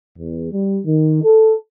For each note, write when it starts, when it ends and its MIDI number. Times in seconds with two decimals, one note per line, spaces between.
0.19 0.49 40
0.52 0.80 55
0.86 1.22 51
1.23 1.56 69